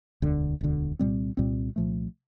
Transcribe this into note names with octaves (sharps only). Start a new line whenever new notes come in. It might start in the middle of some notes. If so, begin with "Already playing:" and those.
E1 D2 D3
E1 D2 D3
C2 A#2 G3 C4
C2 A#2 G3 C4
C2 A#2 F3 A3